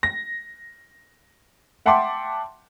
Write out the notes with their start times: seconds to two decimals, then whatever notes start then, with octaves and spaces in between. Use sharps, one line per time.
0.03 A#6
1.86 E5 F#5 G5 A5 C6 D6